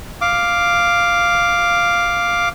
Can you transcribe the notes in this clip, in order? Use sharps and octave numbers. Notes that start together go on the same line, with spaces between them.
F5 D6